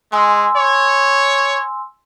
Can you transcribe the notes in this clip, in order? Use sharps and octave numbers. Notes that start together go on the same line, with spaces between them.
G#3 G#5 C6 E6
C#5